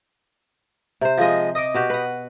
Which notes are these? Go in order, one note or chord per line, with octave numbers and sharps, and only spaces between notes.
C3 C5
F3 G#3 D#5
D#5 D6
B2 F#4 G4
B4 F#5